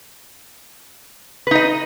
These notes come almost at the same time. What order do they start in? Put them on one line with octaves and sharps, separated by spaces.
B4 D#4 D#5